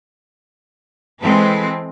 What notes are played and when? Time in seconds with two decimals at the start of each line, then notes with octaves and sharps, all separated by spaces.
1.22 E3 G#3 C4 A4 B4